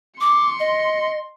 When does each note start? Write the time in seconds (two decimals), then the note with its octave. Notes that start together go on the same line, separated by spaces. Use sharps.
0.21 C6 D6 C#7
0.59 D#5